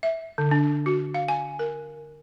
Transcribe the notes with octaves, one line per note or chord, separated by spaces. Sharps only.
E5
D3
D4
F#4
F5
G#5
A#4